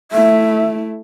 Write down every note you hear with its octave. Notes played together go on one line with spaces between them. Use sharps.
A3 E4 E5